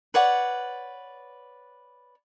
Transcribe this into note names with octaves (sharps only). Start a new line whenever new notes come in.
B4 C#5 D5 F#5